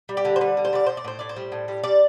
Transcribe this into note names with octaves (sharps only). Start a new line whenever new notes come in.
G3
G4
D3
C5
G3 B4
D3
C5
G3 D5
A2 C5
D5
A2 C5
A2 D5
C5
G3
A2
G3
G3 D5